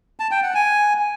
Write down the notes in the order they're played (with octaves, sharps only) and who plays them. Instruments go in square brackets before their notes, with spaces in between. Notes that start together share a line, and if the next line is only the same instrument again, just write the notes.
[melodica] A5
G5
F#5
G#5